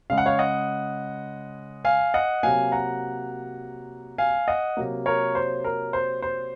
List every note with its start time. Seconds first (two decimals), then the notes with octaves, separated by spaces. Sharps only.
0.10 C#3 G#3 F5
0.18 F#5
0.26 C#5 F5
0.39 D#5 F#5
1.85 F5 G#5
2.14 D#5 F#5
2.43 C3 F#3 A#3 F5 G#5
2.72 F#5 A#5
4.18 F5 G#5
4.48 D#5 F#5
4.77 C3 F#3 A#3
5.06 A#4 C#5
5.35 C5
5.64 A#4
5.93 C5
6.22 C5